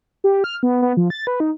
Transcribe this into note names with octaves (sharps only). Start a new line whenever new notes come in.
G4
F6
B3
B3
F3
A6
B4
D#4